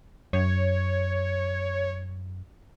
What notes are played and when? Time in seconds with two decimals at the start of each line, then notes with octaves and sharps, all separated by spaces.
0.33 F#2 C#5